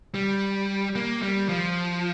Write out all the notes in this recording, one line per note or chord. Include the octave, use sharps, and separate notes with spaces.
G3
A#3
G3
F3